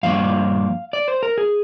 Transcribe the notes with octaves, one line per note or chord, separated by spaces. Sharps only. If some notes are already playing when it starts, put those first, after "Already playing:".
G2 F3 A#3 D4 F5
D5
C5
A#4
G#4